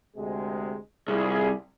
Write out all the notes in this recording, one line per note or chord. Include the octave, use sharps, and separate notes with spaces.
D2 C3 G#3
C2 E4 F4 G#4